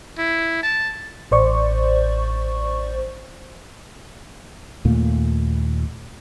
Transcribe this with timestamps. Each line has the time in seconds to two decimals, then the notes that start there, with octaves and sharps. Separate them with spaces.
0.18 E4
0.63 A5
1.31 A1 C5 D5 C#6
4.85 D#2 A#2 A3 A#3